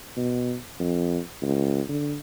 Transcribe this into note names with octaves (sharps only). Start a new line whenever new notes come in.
B2
F2
C#2
D3